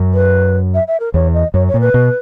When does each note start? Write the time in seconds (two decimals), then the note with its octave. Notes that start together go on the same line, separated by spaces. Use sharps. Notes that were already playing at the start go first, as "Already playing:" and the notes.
Already playing: F#2
0.14 B4
0.74 E5
0.88 E5
1.00 A#4
1.14 E2 C#5
1.34 D#5
1.54 F#2 C#5
1.68 C#5
1.74 A#2
1.80 B4
1.94 B2